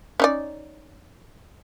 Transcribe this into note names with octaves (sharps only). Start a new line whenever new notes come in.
C#4 D#4 D5